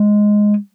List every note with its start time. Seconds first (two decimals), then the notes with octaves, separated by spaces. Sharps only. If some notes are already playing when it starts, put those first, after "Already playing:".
Already playing: G#3